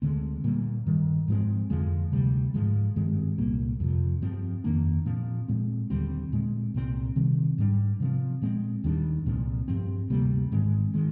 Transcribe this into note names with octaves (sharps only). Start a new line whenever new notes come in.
D2 D3 G#3 C4
A#2 G3 A#3
G2 D#3 G3
G#2 F3 G#3 C4
F2 D3 F3 G#3
D2 C3 G3
G#2 F3 G#3
G2 D#3 G#3 C4
C2 A#2 G3 A#3
F2 C3 F3
G2 F3 C4
F2 D#3 A#3 D4
A#2 F3 C4
A#2 G#3 C4
D#2 D3 G3 C4
A#2 G#3 C4
C2 A#2 G3 C4
C3 D#3 G3 C4
G#2 G3 D4
C3 F3 C4
A#2 G#3 C4
D#2 D#3 G3 D4
C2 A#2 F3 C4
G2 F3 C4
D2 C3 G3 A#3
G#2 D#3 G#3 C4
D#3 G#3